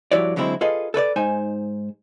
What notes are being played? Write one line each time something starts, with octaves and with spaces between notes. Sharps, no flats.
G2 F3 E4 F#4 C#5 D5
D3 F#3 G#3 C4 E4
F4 G#4 A4 B4 D#5
A4 B4 C#5 D5
G#2 D#4 C5 G#5